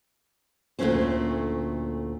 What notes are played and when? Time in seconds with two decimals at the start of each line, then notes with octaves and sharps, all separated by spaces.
0.79 D2 A#2 G#3 A3 C#4 C5